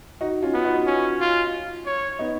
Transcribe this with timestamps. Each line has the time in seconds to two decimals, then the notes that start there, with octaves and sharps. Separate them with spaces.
0.21 D#4 F#4
0.42 C#4 F4
0.54 B3
0.64 D#4 F#4
0.87 C#4
1.20 F4
1.86 C#5
2.19 B3 D#4